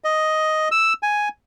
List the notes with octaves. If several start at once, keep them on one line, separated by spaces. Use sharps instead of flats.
D#5
E6
G#5